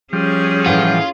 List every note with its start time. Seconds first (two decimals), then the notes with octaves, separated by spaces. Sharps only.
0.13 F3 G3 C#4 G#4
0.66 A2 E3 F4 F#5